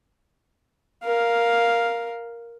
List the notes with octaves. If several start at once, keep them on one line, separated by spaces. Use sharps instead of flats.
A#4 F5